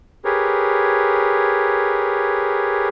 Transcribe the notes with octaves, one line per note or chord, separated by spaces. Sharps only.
G4 G#4 A#4 B4 C#5